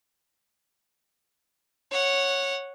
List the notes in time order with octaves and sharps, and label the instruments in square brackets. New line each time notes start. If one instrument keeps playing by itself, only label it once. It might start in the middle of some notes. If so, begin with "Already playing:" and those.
[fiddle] C#5 F#5